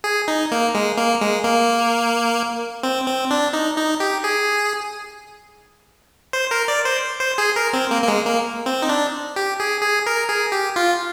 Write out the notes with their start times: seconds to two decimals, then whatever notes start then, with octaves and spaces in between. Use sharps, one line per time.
0.04 G#4
0.28 D#4
0.52 A#3
0.75 G#3
0.97 A#3
1.21 G#3
1.44 A#3
2.83 C4
3.08 C4
3.31 D4
3.53 D#4
3.78 D#4
4.00 G4
4.24 G#4
6.33 C5
6.51 A#4
6.68 D5
6.85 C5
7.20 C5
7.38 G#4
7.56 A#4
7.73 C4
7.91 A#3
8.02 A#3
8.08 G#3
8.26 A#3
8.66 C4
8.82 D#4
8.89 D4
9.36 G4
9.60 G#4
9.82 G#4
10.06 A#4
10.29 G#4
10.52 G4
10.76 F4